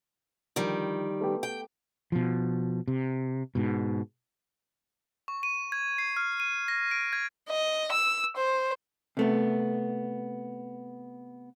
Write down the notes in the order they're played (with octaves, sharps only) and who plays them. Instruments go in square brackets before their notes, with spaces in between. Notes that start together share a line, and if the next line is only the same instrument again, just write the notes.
[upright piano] D3 F3 [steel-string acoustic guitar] D#3 G3
[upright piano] A3 B3 G4
[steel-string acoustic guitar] G5
[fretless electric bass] B2 F3
C3
G#2 B2
[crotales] C#6
D#7
G#6
C7
F6
D#7
A#6
D7
G#6
[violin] D#5
E6
C5
[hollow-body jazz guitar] C3 A3 B3